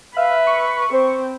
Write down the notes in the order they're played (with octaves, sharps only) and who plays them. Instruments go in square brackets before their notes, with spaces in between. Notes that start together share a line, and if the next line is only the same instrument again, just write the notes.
[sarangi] B4 [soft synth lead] E5 [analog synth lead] F5
[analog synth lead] C#6
[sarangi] C4 [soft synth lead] C5